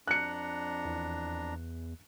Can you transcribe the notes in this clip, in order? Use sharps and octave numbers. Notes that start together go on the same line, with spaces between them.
F2 D4 A#5 F#6 C#7
E2